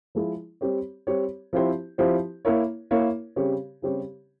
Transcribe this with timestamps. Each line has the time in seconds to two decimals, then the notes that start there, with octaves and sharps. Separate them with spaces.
0.15 F3 G#3 E4
0.61 G3 C4 G4 C#5
1.07 G3 C4 G4 C#5
1.53 F3 C4 E4 G4 C5
1.98 F3 C4 E4 G4 C5
2.45 A#3 E4 A#4 C#5
2.91 A#3 E4 A#4 C#5
3.36 C#3 G3 C4 G4 C#5
3.82 C#3 G3 C4 G4 C#5